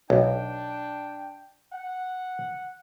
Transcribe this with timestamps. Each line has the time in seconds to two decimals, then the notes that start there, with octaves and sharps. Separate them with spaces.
0.10 B1 D4 G5
1.73 F#5